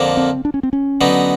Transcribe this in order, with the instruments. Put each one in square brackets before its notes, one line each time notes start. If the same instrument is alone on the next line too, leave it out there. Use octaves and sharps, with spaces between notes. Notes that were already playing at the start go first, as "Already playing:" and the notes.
Already playing: [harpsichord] F2 D3 F3 A#3
[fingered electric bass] C4
D4
C#4
C4
C#4
[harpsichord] D3 F#3 B3 D#4